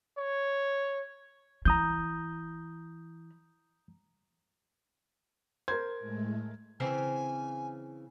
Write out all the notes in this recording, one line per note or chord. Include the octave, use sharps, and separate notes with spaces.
C#5
E3 A#5 D#6 G6
A#4 C5 G#6
A2 G#3 A3
C#3 E3 C4 G#5